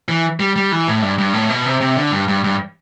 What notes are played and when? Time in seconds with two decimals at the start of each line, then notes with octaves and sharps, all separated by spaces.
0.09 E3
0.40 G3
0.56 G3
0.72 E3
0.88 A2
1.02 G2
1.18 G2
1.33 A2
1.49 B2
1.66 C3
1.81 C3
1.96 D3
2.11 G2
2.28 G2
2.44 G2